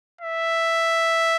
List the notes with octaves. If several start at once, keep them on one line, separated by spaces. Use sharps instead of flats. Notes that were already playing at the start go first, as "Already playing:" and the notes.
E5